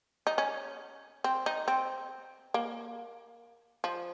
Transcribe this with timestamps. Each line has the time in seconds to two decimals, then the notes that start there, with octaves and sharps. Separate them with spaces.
0.27 D#4
0.38 C#4
1.24 C4
1.46 D#4
1.68 C4
2.54 A#3
3.84 F3